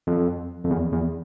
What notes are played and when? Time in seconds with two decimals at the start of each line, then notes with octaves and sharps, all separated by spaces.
0.07 F2
0.64 F2
0.70 E2
0.92 E2